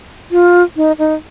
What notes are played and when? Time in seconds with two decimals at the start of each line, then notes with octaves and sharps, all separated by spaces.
0.32 F4
0.76 D#4
0.99 D#4